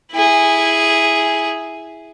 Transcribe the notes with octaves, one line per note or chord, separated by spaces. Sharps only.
E4 G#4